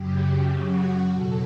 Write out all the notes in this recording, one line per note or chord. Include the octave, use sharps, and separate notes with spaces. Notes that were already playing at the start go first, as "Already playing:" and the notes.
Already playing: F#2 C#3 F#3 G4
F#4
E2 B2 F#3 A4